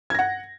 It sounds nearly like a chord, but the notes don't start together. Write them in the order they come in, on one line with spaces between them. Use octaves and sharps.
G#6 A#6 F#5